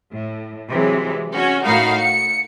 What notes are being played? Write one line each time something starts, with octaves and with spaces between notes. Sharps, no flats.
A2
C3 E3 F#3 G#3
C#4 F#4
A2 D#4 F#4 A#4 F5 B5
C#7